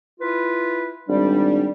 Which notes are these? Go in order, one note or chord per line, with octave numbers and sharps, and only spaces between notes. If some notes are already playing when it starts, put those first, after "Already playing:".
E4 F4 B4
G#1 G3 D4